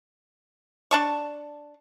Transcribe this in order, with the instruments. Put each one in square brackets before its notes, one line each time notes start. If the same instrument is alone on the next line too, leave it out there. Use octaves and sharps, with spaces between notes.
[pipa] D4 A5 C#6